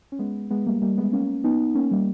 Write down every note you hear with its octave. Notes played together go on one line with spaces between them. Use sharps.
C#4
G#3 B3
G#3 B3
G3 A#3
G3 A#3
G#3 B3
A#3 C#4
B3 D#4
A#3 C#4
G3 A#3